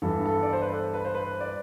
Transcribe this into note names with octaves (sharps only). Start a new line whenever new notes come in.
G2 E3 B3 A4
A4
D5
C5
B4
A4
B4
C5
B4
D5